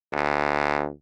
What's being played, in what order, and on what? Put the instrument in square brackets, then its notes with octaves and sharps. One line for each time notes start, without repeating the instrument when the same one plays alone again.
[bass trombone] D2